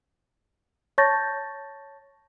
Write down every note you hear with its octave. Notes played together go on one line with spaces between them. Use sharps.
C#5 A5 C#6 G6 A6 A#6